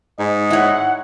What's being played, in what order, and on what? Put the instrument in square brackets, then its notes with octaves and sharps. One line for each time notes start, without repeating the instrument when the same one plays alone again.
[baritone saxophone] G#2 [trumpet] D#5
[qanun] E4 C#5 [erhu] F#5